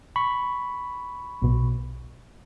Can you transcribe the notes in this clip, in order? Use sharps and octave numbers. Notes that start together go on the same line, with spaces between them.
B5 C#6
B1 B2